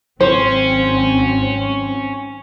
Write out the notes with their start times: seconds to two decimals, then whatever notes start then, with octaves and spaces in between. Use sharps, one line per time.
0.21 G#1 F#3 C4 C#4 C5